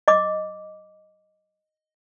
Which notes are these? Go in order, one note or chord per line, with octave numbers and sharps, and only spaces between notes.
D#5 D6